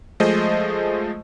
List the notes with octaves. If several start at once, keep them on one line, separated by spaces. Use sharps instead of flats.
F3 G#3 A3 G#4 C5 D#5